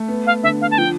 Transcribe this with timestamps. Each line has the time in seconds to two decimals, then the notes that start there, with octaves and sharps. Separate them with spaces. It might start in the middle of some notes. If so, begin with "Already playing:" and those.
Already playing: A3
0.08 B3
0.26 F5
0.43 D3 E5
0.61 F5
0.71 A5
0.78 F3 G5